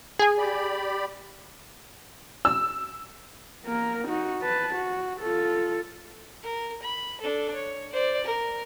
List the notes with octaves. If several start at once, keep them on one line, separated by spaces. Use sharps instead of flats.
G#4 G#5
G4 D5 B5
E6
A#3 A#4
D#4 F#4
B4 A5
F#4
F4 A4
A#4
B5
D4 A4
C#5
C5 D5
A#4